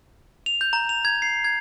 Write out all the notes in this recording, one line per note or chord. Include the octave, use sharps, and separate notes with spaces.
F7
G6
A#5
F7
G#6
C7
G#6